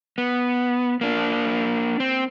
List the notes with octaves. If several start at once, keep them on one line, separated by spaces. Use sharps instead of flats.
B3
A#3 D4
C4